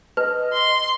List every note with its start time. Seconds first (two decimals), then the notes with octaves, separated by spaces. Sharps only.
0.17 B4 D#5
0.53 C6